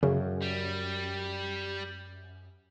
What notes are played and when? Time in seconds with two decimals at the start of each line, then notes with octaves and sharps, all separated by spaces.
0.03 F#2 C#3
0.42 G3